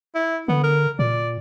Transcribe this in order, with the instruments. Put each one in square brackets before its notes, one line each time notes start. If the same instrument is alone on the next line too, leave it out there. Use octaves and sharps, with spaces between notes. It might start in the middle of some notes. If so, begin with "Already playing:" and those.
[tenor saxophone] E4
[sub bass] D3 [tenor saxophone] B3
[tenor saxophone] A#4
[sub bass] A#2 [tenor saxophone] D5